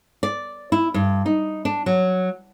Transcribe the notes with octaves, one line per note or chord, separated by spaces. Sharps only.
D5
E4
G2
D#4
D4
F#3